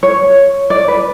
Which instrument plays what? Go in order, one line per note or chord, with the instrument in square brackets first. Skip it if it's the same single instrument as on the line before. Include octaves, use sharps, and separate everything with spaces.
[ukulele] C#5
D5
B4